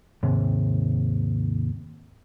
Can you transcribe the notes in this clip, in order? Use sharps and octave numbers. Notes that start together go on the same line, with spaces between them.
D#2 G#2 C3